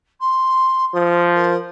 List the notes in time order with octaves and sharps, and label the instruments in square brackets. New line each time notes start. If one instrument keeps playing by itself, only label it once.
[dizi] C6
[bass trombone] F3 [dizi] D#6
[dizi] A#4